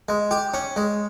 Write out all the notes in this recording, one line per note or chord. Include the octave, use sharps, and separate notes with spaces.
G#3
G4
C#4
G#3